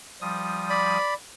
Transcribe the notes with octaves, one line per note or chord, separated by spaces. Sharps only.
F3 G3 D#6
D5 B5